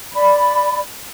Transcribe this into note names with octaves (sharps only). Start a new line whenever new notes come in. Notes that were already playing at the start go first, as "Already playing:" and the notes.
D5 B5